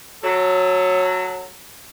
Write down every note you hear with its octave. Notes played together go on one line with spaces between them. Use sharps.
F#3 A4